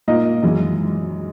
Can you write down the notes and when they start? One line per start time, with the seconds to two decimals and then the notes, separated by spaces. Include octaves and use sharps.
0.08 A#2 A#3 D#4 D#5
0.43 G#1 F#2 E3 G#3